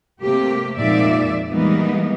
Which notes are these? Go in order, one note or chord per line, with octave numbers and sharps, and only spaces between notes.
C3 A3 A#3 G4
F2 A#2 G#3 D#4 D5 E5
E3 G3 G#3 A#3 B3 D#4